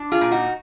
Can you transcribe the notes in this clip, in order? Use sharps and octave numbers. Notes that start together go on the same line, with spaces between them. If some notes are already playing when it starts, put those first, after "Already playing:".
Already playing: D4
F4 G#4
A#2
D#4 F#4